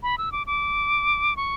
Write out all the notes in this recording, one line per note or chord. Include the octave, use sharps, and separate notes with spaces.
B5
E6
D6
D6
C#6